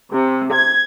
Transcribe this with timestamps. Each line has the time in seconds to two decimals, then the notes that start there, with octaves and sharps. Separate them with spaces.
0.13 C3
0.53 G#6